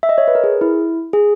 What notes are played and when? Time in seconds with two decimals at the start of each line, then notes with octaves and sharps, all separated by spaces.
0.03 E5
0.09 D#5
0.18 C#5
0.28 B4
0.35 A#4
0.44 G#4
0.61 E4
1.13 G#4